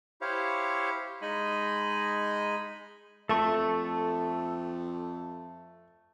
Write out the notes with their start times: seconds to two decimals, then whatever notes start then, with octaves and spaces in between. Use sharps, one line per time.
0.21 E4 G4 C5 C#5 F5
1.22 G#3 D#4 D#5 G#5 B5
3.29 F2 A3 A4 C#6